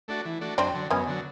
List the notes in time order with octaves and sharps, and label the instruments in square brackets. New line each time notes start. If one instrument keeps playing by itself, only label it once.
[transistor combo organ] A3 D4 F#4
E3
A3 D4 F#4
[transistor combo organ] F#2 [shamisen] C4 D4
[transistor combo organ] D3 F#3
[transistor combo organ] F#2 [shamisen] B3 C#4
[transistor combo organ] D3 F#3